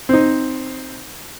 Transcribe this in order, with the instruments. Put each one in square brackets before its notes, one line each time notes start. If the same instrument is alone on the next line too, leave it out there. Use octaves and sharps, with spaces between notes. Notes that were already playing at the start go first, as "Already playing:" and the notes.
[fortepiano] C4 D#4